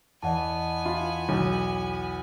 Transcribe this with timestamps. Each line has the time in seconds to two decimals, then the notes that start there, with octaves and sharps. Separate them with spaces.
0.23 E2 B3 D#5 F#5 G#5 A5
0.85 F4 B5
1.29 B1